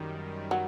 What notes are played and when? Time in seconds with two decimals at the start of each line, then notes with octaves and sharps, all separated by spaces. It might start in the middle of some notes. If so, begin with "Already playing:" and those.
Already playing: F#2 D#3 G3
0.51 F#3